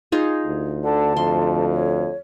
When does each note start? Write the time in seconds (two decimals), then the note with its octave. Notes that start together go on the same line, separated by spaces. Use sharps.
0.12 D#4 F4 G#4
0.45 D2
0.84 D3 A5
1.17 F2 C6
1.73 C#5